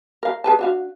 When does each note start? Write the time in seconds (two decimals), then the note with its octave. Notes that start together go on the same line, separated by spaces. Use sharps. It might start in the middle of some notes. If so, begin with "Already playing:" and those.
0.23 A#4 F5
0.44 G#4 B4 A5
0.59 D4 F#4 F5